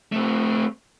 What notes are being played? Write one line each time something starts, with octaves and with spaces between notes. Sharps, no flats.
A3 C4